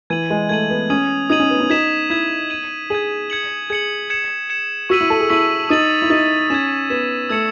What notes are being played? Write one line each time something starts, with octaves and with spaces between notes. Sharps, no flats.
E3 G#6 D#7 F#7
G#3
A3 G#6 D#7 F#7
B3
C#4 D#6 G#6 D#7 F#7
D#4 D#6 G#6 D#7 F#7
C#4
B3
C#4
D#4 G#6 B6 E7
E4 G#6 B6 E7
G#6 D#7 F#7
G#4 G#6 D#7 F#7
G#6 C#7 F#7
G#4 G#6 C#7 F#7
G#6 C#7 E7
G#6 C#7 E7
F#4 C#6 E6 B6 D#7 F#7
E4
A4
G#4
E4 C#6 E6 B6 D#7 F#7
D#4 D#6 A6 D#7 F#7
E4
D#4 D#6 A6 D#7 F#7
C#4 G#6 B6 E7
B3 G#6 B6 E7
A3 E6 G#6 C#7 E7